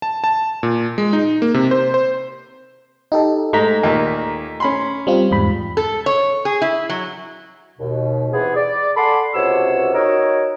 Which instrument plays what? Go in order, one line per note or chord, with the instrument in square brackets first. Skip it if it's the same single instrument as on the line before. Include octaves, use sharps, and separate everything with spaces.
[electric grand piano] A5
A5
A#2
G#3
D#4
A#3
C3
C5
C5
[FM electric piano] D#4 G4 A4
[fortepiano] G#2 [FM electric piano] A3 A#5 B6
[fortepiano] D#2 A#2
C#4 B5 C6
[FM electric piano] G3 C4 F4
E2 G#2 B5
[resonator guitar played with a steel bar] A4
C#5
G#4
E4
F#3
[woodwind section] D#2 B2
C3 E3 B3 G#4
D5
A4 F#5 G#5 B5 C6 D6
C#2 C3 F#4 C#5 E6
D#4 F#4 A#4 C#5